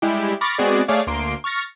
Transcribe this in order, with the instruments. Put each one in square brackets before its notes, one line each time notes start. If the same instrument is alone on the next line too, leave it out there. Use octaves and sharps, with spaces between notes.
[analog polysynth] G3 G#3 E4 G4
B5 C#6 D6 F6 A6 A#6
G#3 B3 C4 F#4 G#4 D5
A3 G#4 C#5 D5 F5
D2 A#3 C6 D7
C#6 F6 A6 A#6 C#7